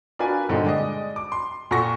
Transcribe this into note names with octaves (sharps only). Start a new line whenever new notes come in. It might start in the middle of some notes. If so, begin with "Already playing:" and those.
D4 F4 F#4 A#4 B4 G#5
G2 A#2 D3 C4 D#4
G#3 D5 D#5
D6
C6
A#2 A4 F#5 C#6 A#6